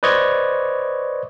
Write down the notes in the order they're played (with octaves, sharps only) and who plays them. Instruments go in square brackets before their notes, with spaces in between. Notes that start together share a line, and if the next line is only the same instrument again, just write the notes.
[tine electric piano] B4 C5 D5 D#5 C#6 G#6